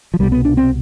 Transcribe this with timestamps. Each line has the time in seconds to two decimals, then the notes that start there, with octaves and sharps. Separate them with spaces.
0.14 F3
0.19 C2 B2 G3
0.32 B3
0.45 D4
0.57 C4